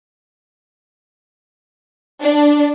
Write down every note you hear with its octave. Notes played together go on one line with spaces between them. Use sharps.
D4